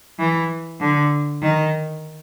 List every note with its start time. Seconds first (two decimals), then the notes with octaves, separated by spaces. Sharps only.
0.19 E3
0.80 D3
1.42 D#3